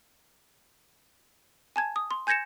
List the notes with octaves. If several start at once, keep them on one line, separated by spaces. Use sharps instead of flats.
G#5 A5 G#6
D#6
C6
G#5 G6 G#6 A#6 C#7 E7